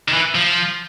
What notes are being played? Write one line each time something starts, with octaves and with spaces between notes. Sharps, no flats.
D#3
E3
F3